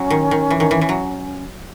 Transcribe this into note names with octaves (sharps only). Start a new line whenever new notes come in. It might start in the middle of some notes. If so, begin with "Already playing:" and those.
Already playing: F#3 C#4
D#3
D#3
E3
D#3
E3
E3
F#3